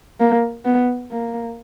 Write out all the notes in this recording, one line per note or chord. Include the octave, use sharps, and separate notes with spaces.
A#3
B3
A#3